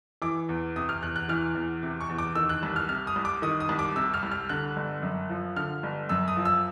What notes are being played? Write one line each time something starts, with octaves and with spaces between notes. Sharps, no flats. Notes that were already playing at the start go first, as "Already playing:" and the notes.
E3 D6
E2
C3 D#6
F6
E2 F#6
F#6
E3 F6
E2
C3
C#6
E2
D6
D#3 E6
F#6
C2
F6
C3 F6
D#6
C2
D6
D#3 D#6
D#6
C2
D6
C3 E6
F6
C2
F6
D3 F#6
G1
F#2
F3
D3 F6
G1
F#2 E6
D#6
F3
E6